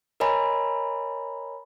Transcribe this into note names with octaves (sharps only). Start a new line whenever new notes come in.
A#4 C#5 D#5 G#5 A#5 B5